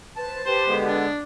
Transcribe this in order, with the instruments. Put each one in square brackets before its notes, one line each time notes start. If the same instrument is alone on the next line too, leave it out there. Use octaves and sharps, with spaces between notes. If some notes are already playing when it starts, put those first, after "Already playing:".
[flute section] B4 C5 [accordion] A5
[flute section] G4 B4 [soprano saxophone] C5
[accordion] D3 G#3 B3
[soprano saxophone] D4